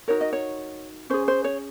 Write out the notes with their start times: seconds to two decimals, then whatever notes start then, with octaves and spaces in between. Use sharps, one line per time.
0.08 D#4 F#4 A#4 C#5
0.21 D#5
0.33 C#5
1.10 C#4 G#4 C5
1.28 C5
1.44 C#5